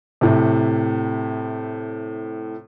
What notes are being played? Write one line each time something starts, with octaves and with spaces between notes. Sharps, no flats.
A2 C3